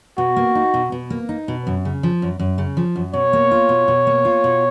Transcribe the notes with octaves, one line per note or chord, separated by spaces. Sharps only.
B2 F#4
A#3
D#4
B2
B2
A#3
D#4
B2
F#2
C#3
F3
F#2
F#2
C#3
F3
F#2
B2 C#5
A#3
F4
B2
B2
A#3
F4
B2